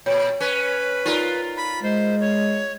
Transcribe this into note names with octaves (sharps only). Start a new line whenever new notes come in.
A#2 C#5
C#4 B4
D#4 F4 A4 A#4 D5
B5
G#3 C5
C#5